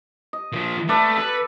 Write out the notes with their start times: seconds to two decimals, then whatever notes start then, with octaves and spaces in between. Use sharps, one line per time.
0.33 D#5
0.52 A#2 F3
0.89 A3 A4 B4 D5
1.17 A4 B4